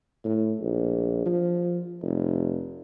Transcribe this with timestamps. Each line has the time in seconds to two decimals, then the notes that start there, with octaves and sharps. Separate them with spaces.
0.25 A2
0.60 A#1
1.26 F3
2.02 F1